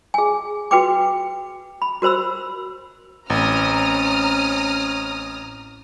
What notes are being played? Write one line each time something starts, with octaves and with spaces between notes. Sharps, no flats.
G#4 G#5
F#4 B4 G5 D6
B5
F#4 A#4 C5 B5 E6
A1 C4 C#4 A#5 D#6 F6